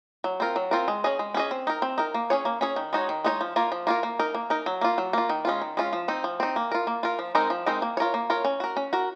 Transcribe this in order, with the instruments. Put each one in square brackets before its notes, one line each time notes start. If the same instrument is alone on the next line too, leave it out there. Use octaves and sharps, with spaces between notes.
[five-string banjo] F#3
C4 F4 A#4
F#3
C4 F4 A#4
G#3
C#4 G#4 D#5
G#3
C#4 G#4 D#5
C4
D#4 A#4
C4
D#4 A#4
A#3
C#4 G#4 C#5
A#3
C#4 G#4 C#5
D#3
G#3 D#4 F#4 C#5
D#3
G#3 D#4 F#4 C#5
F3
A#3 F4 A#4
F3
A#3 F4 A#4
A#3
D#4 A#4
A#3
D#4 A#4
F#3
A#3 F4
F#3
A#3 F4
D#3
G#3 C#4 F4
D#3
G#3 C#4 F4
F3
C4 D#4
F3
C4 D#4
A#3
F4 A#4
A#3
F4 A#4
F3
G#3 C4 D#4 A#4
F3
G#3 C4 D#4 A#4
A#3
F4 A#4 C#5
A#3
F4 A#4 C#5
C#4
F#4 A#4
C#4
F#4 A#4